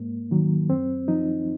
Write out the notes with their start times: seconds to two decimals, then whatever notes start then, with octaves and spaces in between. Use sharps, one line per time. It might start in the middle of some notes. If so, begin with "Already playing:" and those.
Already playing: G#2 A#3
0.31 D#3 F#3
0.70 F#2 C4
1.08 F3 D#4